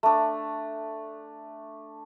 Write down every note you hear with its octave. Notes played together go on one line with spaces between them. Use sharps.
A3 D4